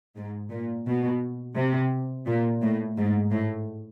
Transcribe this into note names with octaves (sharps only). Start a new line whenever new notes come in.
G#2
A#2
B2
C3
A#2
A2
G#2
A2